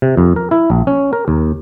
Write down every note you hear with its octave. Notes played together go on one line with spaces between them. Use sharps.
C3
F2
A#4
E4
A#1
C#4
A#4
D#2